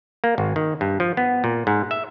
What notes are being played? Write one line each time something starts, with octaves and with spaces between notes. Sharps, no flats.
A#3
G#1
D#3
G2
F3
B3
A#2
G#2
E5